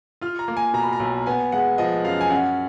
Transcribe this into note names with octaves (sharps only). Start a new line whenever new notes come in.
F4 F6
A#5
A#3
G#5
B2 A#5
B5
A#5
B1
B3 G#5
G#3 F#5
F3 D#5
F#2 F5
G#5
C#4 F#5